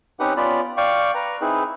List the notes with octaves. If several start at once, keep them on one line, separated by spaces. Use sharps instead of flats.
C4 C#4 D#4 G4 B4 F#5
B3 C#4 F4 D5 B5
D5 F5 G5 C#6
B4 A#5
C4 D#4 E4 G#4 B4